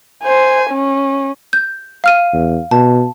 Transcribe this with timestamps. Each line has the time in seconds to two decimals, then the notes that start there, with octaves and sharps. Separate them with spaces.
0.24 C5 G#5
0.70 C#4
1.53 G6
2.04 F5 F6 D#7
2.33 E2
2.71 B2 A5